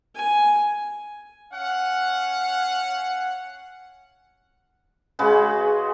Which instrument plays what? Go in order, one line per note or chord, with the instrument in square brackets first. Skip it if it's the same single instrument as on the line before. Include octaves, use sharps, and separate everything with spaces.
[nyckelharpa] G#5
[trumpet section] C#4 F5 F#5
[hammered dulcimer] C#3 G#3 F#4 B4